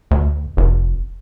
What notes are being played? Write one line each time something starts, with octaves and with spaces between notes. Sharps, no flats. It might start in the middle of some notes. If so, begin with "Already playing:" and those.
D2
F1